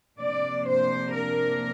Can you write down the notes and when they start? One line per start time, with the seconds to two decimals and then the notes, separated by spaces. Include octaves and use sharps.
0.20 C3 F3 A#3 D4 D5
0.67 C5
1.14 A#4